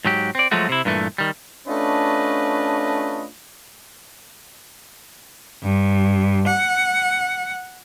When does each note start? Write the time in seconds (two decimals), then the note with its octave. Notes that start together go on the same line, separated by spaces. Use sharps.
0.05 G#2 F#3 G4
0.35 C4 D5
0.51 F3 F#3 G#3 A3 F#4
0.69 C3 E4
0.85 G2 A#2 E3 A3
1.18 D#3 G3
1.68 A3 C#4 D4 F4 B4 D#5
5.63 G2
6.47 F#5